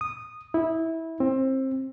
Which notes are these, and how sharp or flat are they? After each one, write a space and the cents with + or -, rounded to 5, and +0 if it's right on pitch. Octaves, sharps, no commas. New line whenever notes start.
D#6 -10
E4 -20
C4 +20